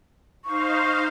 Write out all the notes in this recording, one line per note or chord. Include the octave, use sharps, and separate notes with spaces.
D#4 C5 F5 C#6